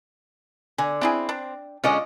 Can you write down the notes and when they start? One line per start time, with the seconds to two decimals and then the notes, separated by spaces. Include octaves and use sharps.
0.78 D3 G#5
1.01 C4 D4 E4 G#4
1.29 D4
1.84 D3 G#3 C#4 F4 D5 D#5